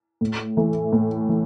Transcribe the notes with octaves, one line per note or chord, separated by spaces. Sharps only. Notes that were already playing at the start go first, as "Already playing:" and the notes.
A2
E3 A3
A2
E3